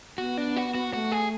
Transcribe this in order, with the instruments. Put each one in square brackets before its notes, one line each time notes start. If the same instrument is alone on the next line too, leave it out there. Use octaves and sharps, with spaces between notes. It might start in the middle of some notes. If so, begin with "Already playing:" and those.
[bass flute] B3 [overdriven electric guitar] F#4
[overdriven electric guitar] D4
F#4
F#4
[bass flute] A3 [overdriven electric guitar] F#4
[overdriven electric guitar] G#4